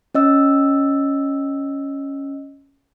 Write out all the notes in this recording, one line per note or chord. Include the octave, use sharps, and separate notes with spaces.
C#4 D#5 E6